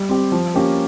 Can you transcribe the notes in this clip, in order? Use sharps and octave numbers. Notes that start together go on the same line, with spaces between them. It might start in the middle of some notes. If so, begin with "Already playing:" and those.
Already playing: G3
C4 G4
F3
A#3 C#4 G4 A#4